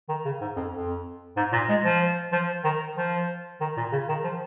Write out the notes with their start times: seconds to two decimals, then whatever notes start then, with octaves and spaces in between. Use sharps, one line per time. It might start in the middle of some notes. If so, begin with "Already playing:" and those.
0.09 D#3
0.25 C#3
0.41 G#2
0.56 F2
0.73 F2
1.37 G#2
1.53 A#2
1.69 G#3
1.85 F3
2.32 F3
2.64 D#3
2.97 F3
3.61 D#3
3.77 A#2
3.92 C#3
4.09 D#3
4.24 F3